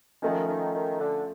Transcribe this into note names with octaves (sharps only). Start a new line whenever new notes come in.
D#3 F3 A3 C#4
D#3
D#3
D3